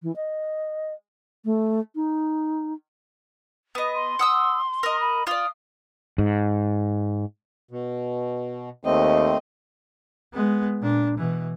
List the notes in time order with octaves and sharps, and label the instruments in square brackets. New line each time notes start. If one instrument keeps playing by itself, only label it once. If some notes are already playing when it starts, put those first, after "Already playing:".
[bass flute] E3
D#5
A3
D#4
[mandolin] B3 D#5
[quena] C6
[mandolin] F#5 D#6 E6
A#4 D#5
[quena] B5
[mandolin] F4 D5 [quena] D#6
[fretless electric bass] G#2
[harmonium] B2
[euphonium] D#2 [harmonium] A3 C4 [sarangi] D#5
[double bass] G#3 B3
A#2 D4
B2 E3